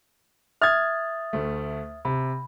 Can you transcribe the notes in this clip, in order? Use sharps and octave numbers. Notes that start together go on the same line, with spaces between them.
E5 D#6 F6 G#6 A6
D2 A3
C3 B5